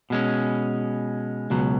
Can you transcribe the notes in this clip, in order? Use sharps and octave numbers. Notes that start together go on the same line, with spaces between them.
B2 G#3 C#4
C#2 B2 F#3